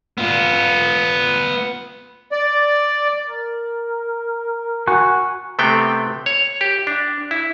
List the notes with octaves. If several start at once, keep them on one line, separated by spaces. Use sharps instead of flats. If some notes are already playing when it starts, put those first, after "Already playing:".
B3 F4
D5
A#4
F#4 G#5 C#6 F#6
C3 A3 B3 C4 G5
C#5
G4
D4
E4